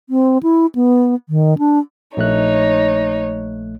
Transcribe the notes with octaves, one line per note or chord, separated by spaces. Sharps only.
C4
E4
B3
D#3
D4
A#1 A3 D#4 C#5 F#6